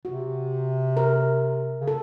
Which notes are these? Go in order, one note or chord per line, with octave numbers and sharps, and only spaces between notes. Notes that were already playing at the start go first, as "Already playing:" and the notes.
C3 F#4
A#4
C#3
A4